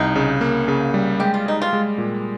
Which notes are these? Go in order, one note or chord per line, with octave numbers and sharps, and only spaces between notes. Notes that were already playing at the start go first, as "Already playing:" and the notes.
Already playing: C2 D#4
C#3
A#3
C#3
G3
G#3 G4
F4
D#4 G#4
F4
G#3
A#2